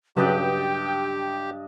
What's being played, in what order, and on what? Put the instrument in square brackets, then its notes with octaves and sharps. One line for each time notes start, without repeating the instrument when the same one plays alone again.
[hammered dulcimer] G2 D#5 A5 [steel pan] C#3 F#3 B4 [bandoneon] G4 [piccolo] G5